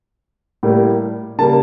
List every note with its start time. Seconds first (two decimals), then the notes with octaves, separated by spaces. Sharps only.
0.63 A2 G3 A#3
1.38 C#3 G3 A#3 A5